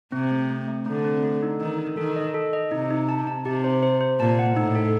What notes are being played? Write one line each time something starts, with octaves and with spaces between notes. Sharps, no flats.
C3 C4
A3
A3
A3
D3 A3
C4
A3
D#4
D#3 D#4
D#4
D#3 A4
D#5
A4
D#5
C3 D#4
D#4
A5
A5
C3 G4
C5
C5
C5
A#2 A5
F#5
A2 D#4
A4